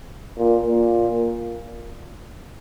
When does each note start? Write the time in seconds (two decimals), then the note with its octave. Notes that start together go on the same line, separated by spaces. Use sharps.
0.38 A#2
0.67 A#2